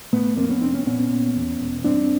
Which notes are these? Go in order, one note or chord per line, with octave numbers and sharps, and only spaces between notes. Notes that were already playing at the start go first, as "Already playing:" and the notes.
A2 A3 B3
F2 A#3 C4
B3 C#4
F1 C4 D4
B3 C#4
A#2 B3 C#4
A#2
E2
E1
G2 C4 D4